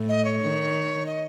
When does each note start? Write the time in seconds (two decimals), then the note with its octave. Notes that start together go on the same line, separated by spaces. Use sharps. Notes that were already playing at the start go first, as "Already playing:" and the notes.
Already playing: A2
0.09 D#5
0.25 C#5
0.41 D#3
1.06 D#5